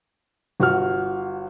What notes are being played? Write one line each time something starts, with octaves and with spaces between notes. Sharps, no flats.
G1 F#4 F6